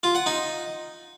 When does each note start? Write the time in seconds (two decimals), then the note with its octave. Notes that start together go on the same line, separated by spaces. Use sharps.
0.03 F4
0.15 F#5
0.26 D#4